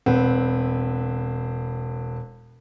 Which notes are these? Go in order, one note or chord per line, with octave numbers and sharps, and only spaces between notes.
E1 C4 B4 F#5